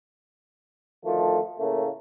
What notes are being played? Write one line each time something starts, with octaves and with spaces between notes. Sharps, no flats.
D2 D#3 F3 A3
A2 C#3 A3 A#3